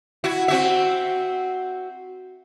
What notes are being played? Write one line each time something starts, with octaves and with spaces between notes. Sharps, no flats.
E4 F#4
C4 F#4 E5